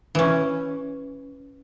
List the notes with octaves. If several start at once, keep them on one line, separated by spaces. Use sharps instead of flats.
E3 C#4